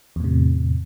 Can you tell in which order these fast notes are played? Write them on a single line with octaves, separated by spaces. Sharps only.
E2 A2 C3